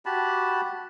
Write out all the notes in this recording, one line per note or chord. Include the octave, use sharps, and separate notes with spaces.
F#4 G4 A5 B5